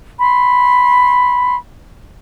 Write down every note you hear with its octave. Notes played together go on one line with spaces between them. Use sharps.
B5 C6